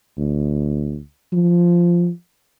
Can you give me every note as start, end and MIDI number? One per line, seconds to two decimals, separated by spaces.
0.18 0.99 38
1.33 2.09 53